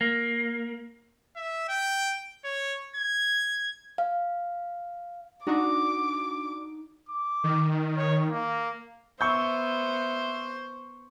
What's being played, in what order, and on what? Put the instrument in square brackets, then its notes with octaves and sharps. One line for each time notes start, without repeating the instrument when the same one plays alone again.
[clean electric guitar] A#3
[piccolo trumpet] E5
G5
C#5
G#6
[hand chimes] F5
[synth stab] D4 F#4 [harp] D#4 [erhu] D6
[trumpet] D6
[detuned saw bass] D#3
[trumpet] C#5
A#3
[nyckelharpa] B3 [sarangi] C5 [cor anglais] E5 [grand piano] C#6 G6